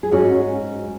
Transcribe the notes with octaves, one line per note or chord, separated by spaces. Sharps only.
G#4
G#2 C#4 F#4